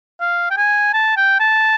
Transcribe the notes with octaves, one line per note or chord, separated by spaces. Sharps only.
F5
G5
G#5
A5
G5
A5